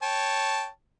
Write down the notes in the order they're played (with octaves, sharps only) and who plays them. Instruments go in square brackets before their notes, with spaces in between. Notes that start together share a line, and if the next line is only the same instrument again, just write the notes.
[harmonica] C#5 G5 A5